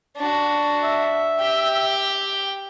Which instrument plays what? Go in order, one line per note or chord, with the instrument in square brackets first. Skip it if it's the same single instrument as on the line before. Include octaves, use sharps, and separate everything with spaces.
[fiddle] D4 F#4
[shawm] E5
[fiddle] G4 G5